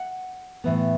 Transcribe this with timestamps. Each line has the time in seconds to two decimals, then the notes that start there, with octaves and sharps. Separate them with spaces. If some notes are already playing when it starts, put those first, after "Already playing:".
Already playing: F#5
0.64 A2 E3 B3